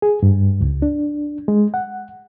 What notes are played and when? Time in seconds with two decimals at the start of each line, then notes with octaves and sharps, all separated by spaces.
0.02 G#4
0.23 G2
0.61 C#2
0.82 D4
1.48 G#3
1.74 F#5